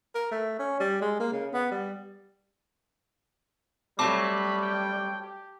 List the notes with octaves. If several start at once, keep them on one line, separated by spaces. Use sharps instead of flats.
A#4
A3
C#4
G3
G#3
A#3
C#3
B3
G3
F#3 G3 A3 C4 A5 B5 D6
G5
G4